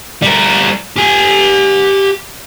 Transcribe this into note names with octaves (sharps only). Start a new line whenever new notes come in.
G3 A#4
G4 G#5